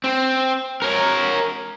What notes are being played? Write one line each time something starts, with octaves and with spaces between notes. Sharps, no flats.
C4
A#4 C#5